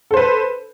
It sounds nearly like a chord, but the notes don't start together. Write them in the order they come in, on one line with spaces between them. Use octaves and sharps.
A4 C5 B4